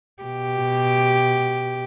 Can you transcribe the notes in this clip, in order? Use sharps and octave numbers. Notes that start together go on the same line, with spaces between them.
B2 G4